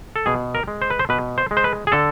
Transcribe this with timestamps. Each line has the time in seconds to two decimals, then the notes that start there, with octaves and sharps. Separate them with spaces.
0.16 A4
0.26 B2 G#4
0.55 A#4
0.68 G#3
0.82 C5
0.90 B4
0.99 C5
1.09 B2 B4
1.38 C5
1.51 G#3
1.57 C5
1.64 B4
1.87 G#4
1.92 D3 A4